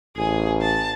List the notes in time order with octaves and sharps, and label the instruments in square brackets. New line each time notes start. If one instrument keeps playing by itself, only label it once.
[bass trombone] A1 [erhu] G#4
[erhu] A5